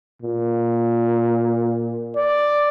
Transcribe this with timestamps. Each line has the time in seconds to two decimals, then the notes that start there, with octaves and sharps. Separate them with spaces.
0.22 A#2
2.17 D5